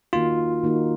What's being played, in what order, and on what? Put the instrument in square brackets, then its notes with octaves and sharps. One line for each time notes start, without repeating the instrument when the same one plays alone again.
[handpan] D#3 A#3 D#4 F#4 [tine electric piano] F4
[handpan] D#3 A#3 D#4 F#4